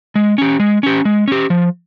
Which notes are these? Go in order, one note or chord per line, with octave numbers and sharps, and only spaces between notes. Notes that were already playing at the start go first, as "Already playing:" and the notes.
G#3
C#4 G4
G#3
C#4 G4
G#3
C#4 G4
F3